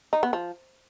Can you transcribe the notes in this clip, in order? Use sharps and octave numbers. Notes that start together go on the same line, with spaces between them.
D#4
B3
F3